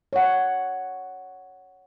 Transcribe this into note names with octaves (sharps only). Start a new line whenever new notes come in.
C#5 F#5